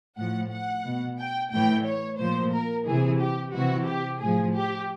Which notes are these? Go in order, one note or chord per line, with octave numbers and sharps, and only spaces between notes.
A2 F3 F#5
F#5
B2
G5
A2 E3 G5
C#5
A#2 F3 C5
A#4
C3 E3 G#4
G4
C3 E3 F#4
G4
A2 F3 G#4
G4